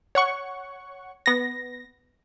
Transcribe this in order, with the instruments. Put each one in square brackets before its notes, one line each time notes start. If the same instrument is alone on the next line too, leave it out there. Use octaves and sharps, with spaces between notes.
[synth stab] C#5 F#5 C#6
B3 A#6